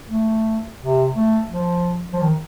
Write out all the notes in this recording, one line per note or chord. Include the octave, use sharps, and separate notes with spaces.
A3
C3
A3
F3
F3
D#3